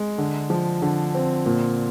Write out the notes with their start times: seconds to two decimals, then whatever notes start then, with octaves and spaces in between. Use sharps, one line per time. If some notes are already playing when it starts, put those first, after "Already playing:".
Already playing: G#3
0.18 D3
0.50 F3
0.82 D3
1.15 C4
1.46 A#2